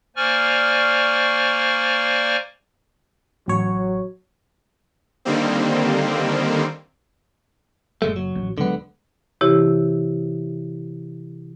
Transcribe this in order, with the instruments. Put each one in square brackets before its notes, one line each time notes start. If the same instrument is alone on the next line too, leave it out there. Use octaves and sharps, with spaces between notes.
[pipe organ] A#3 C5 D5 G#5 C#6 F6
[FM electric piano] A1 C#5 [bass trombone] F#3
[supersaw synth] D3 D#3 G3 A#3 C4
[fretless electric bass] F#1 [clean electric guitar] A#2 G#3 A3
[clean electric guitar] F#3
[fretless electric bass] A1
[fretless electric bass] D#1 F#3 G#3 [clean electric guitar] D3 B3
[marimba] C3 E3 E4 G4 C#5